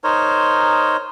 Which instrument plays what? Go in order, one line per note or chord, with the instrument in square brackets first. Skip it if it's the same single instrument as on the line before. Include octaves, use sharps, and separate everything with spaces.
[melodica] D#4 A#4 C5 C#5